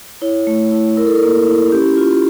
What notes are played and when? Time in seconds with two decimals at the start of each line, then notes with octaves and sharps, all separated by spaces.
0.22 E4 C#5
0.47 A3
0.72 E4
0.97 E4 A#4
1.07 A4
1.16 A#4
1.23 A#3
1.47 E4
1.72 C#4 G4
1.97 F4